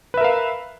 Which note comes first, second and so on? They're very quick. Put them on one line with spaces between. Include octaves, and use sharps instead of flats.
B4 E5 A#4 F5